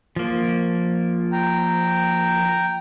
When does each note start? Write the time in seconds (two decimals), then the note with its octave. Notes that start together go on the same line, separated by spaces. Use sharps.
0.16 F3 A#3
1.32 G5 A#5